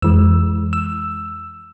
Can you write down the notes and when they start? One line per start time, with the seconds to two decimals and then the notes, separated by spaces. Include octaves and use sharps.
0.02 F2 E3 G#3 E6
0.73 E6